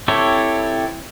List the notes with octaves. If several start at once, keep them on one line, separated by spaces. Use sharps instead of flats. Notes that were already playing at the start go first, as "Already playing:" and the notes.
C4 E4 G4 A4 C#5